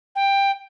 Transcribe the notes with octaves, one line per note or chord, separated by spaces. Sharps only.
G5